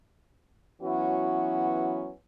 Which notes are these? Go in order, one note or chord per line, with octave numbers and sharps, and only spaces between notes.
E3 F#3 B3 C#4 E4 F#4